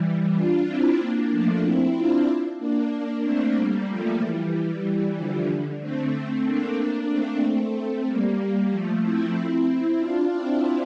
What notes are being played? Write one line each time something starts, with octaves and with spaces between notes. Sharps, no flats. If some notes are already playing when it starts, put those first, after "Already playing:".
Already playing: E3 G3
D4 F4
C4 E4
A#3 D4
F3 A3
C4 E4
D4 F4
A#3 D4
A#3 D4
A3 C4
G3 A#3
F3 A3
E3 G3
D3 F3
D3
A3 C4
A#3 D4
A#3 D4
A3 C4
A3 C4
G3 A#3
F3 A3
C4 E4
C4 E4
D4 F4
C4 E4